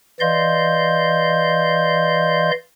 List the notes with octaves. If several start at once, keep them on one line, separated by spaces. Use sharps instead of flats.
E3 D5 D#5 F5 C6 G6